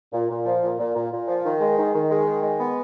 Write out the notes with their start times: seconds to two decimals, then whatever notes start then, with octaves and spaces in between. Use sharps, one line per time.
0.13 A#2
0.30 A#2
0.46 F3
0.63 A#2
0.79 A#2
0.95 A#2
1.12 A#2
1.28 F3
1.44 D#3
1.61 G#3
1.77 D#3
1.94 D#3
2.10 G#3
2.26 D#3
2.42 G#3
2.59 B3